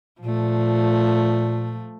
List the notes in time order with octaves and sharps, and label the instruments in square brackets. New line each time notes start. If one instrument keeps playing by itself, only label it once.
[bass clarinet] A#2 [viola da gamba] F3 A3